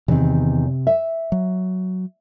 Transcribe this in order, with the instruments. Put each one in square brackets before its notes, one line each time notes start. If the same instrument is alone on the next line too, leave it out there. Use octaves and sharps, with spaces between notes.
[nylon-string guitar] E2 D#3 [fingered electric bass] C3 C4
[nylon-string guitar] E5
[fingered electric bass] F#3